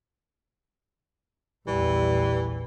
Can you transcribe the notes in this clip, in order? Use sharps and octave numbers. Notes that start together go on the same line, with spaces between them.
A#1 E2 E3 G3